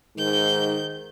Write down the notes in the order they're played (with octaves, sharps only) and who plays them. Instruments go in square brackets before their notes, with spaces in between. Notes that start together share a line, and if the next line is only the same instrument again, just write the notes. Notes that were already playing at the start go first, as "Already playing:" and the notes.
[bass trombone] G#2 [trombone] D#3 [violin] G6